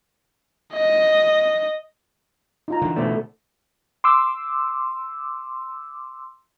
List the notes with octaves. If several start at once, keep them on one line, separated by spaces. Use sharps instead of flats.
D#5
D#4 F4 A#5
D3 E3
B2 A3 C5 D5
C6 D6 E6